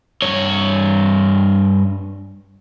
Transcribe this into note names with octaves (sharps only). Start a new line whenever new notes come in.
G2 C#5